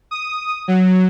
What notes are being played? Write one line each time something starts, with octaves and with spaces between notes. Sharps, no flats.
D#6
F#3